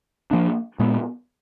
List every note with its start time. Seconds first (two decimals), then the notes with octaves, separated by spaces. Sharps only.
0.31 F3 A#3 D4
0.79 A#2 G#3 B3